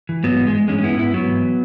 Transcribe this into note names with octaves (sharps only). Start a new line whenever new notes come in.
E3
G#2 F#3 B3
E3
G#3
G#2
E3 G#3 C#4
C#4
G#2 B3 E4
G#2 B3 E4
G#2 F#3 B3
E3